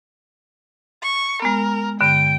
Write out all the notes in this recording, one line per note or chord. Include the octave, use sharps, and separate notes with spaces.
C#6
G#3 B3 A#4
G2 D3 G5 D7